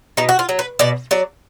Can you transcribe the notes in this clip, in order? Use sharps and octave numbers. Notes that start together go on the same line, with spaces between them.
B2 D#4
F#4
F4
F#3
B4
B2 D5
F#3 D5